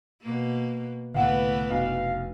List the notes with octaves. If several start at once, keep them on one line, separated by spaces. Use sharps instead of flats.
B2 A#3
C2 A2 D3 E3 A3 B3 F5 F#5
F1 B1 D4 F5